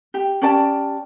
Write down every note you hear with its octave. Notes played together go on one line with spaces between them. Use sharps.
G4
C#4 G4 D5 A5